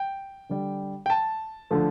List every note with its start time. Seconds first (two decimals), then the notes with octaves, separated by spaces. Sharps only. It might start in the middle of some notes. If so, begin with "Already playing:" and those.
Already playing: G5
0.49 D3 G3
1.06 G5
1.10 A5
1.71 D3 F3 A3